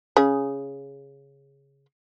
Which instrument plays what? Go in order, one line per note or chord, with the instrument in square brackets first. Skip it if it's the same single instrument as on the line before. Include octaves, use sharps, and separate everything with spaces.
[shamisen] C#3 G#4